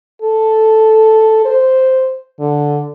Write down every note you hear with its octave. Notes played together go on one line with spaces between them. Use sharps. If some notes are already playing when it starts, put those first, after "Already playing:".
A4
C5
D3